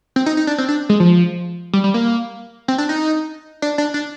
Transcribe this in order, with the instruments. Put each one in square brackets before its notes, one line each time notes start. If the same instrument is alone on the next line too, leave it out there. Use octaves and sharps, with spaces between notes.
[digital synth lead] C4
D#4
D#4
D4
C4
D4
G#3
F3
G3
G3
A#3
C4
D4
D#4
D4
D4
D4